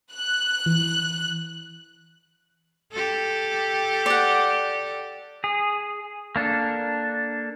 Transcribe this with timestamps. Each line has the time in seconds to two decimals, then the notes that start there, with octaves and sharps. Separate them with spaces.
0.12 F#6
0.66 E3
2.93 G4 A4
4.06 D5 F#5
5.44 G#4
6.36 A#3 D4 A4